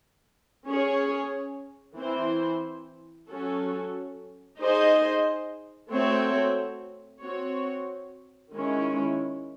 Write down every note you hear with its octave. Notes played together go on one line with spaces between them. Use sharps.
C#4 G#4 C#5
E3 C4 E4 C5
F#3 C#4 F#4 A4
D#4 G#4 C5 D#5
A3 C4 F#4 C#5 E5
C4 F#4 C#5
D#3 G#3 C#4 E4